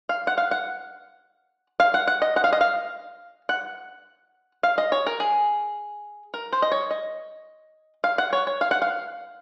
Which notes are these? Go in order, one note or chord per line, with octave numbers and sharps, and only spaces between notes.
F5
F#5
F5
F#5
F5
F#5
F#5
D#5
F#5
F5
D#5
F5
F#5
F5
D#5
C#5
A#4
G#4
A#4
C5
D#5
C#5
D#5
F5
F#5
C#5
C#5
F5
F#5
F5